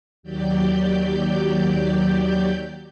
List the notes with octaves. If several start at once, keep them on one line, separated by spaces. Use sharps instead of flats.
D#2 F#3 G4 D5 G6